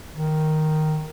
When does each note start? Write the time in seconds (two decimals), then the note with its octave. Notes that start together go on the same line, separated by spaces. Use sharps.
0.13 D#3